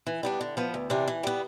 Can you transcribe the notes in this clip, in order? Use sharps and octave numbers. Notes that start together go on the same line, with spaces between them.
E3
G3 B3 D4
D3
F3 B3
D2
C3 E3 G3 D4
E3
G3 B3